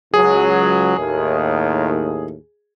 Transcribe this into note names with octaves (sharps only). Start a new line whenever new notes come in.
C#2 F#3 G#4
D#2 A2